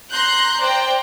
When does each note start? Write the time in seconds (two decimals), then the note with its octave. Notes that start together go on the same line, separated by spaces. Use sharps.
0.11 A#5 C6 F#6 G6
0.60 C5 D5 G5 A#5